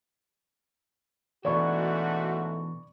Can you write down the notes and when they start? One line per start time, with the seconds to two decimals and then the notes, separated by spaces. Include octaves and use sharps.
1.45 G#2 B2 E3 A3 F#4 D5 C#6